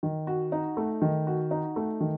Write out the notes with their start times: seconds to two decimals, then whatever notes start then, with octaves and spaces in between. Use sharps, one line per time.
0.03 D#3
0.27 F#4
0.52 D#4
0.77 A3
1.02 D#3
1.27 F#4
1.51 D#4
1.76 A3
2.01 D#3